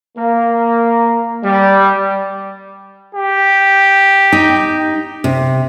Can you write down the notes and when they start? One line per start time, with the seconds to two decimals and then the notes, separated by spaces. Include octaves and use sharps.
0.17 A#3
1.44 G3
3.15 G4
4.32 D#4 G5
5.24 C3